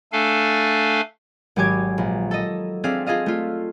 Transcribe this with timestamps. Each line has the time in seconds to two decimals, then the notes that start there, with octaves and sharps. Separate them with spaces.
0.12 A3 D4 A4 F5 G#5
1.56 G#1 F#3 G4 G#5 D6 G#6
1.98 A#1
2.31 A4 D#5
2.84 C4 D4 G#4 E5 F5
3.06 F4 G#4 A4 D#5 F5
3.26 A3 F4